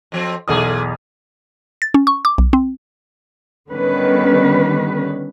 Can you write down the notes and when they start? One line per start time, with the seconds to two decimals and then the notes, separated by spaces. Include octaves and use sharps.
0.12 F2 F3 C4
0.48 B1 E2 A#2 A3 G#4 D#6
1.82 A6
1.94 C#4
2.07 C#6
2.25 D6
2.38 B1
2.53 C4
3.69 D3 D#3 G3 B3 C#4 B4